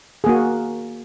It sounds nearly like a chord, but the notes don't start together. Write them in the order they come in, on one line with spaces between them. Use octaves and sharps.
G#4 A#3 F#4